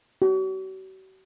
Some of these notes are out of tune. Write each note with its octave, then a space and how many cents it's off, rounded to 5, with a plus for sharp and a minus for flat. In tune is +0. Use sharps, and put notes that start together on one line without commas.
F#4 +45